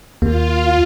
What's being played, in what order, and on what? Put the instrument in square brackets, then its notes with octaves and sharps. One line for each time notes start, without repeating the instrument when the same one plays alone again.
[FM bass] D#2 [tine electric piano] A#3 [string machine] F4